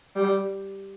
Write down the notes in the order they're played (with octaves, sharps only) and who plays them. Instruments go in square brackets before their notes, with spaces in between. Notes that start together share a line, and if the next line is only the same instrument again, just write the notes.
[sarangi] G3